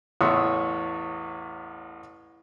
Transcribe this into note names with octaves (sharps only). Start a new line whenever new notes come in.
A1 E2 C#5 C6 D#6 E6